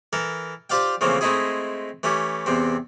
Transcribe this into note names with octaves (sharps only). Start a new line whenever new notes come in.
E3 A4 A#4
F4 G4 C5 D5 F5 G5
C#3 E3 F3 A3 A#3 C4
G#3 A3 C4 D#4 E4 G#4
E3 A3 C#4 G4
E2 C3 C4